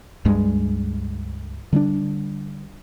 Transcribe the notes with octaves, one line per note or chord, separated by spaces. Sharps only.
C#2 G2 G3 G#3
D3 G3 C4 D4